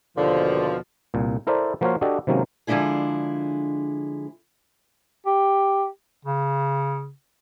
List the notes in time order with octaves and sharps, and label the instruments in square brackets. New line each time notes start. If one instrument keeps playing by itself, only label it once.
[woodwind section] D#2 D3 [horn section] B2 F3
[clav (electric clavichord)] C2 A#2
E4 A4 A#4 C5 D5 E5
F3 A#3 F#4 C5 C#5 F5
D4 F#4 G4 A4 D5 D#5
C3 D#3 F#3 G#3 A#3 C#4
[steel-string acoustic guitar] D3 F3 G#3 D4 E4 G#4
[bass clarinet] G4
C#3